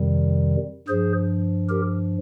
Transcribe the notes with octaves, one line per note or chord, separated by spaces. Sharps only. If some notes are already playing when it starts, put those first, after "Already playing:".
Already playing: F2 C3 D#3 G3
G2 F3 G#4 C5
G4 A#4